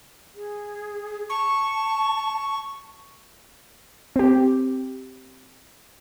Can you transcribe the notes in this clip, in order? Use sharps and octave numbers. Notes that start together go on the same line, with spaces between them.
G#4
A5 C#6
C4 G4